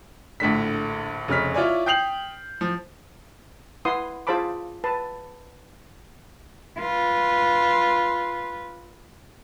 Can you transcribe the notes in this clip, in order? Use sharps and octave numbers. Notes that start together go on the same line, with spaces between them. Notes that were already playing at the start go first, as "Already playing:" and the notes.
A#1 A2 D3 B6
F1 C#3 C#5 F6 B6
E4 F4 C#5 D5 G#5
G5 D#6 G6 C7 F7 F#7
F3
E4 B4 F#5 C6 D#6
F4 G#4 C5 A5 B5 D6
B4 A5
F4 B4